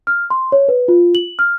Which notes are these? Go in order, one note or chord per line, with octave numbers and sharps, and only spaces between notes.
F6
C6
C#5
B4
F4
F#7
F6